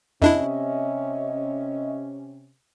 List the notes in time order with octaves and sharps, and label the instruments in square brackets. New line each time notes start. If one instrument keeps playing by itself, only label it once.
[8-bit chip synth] F2 D4 E4 [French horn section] C3 C#4 [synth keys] D#5 E5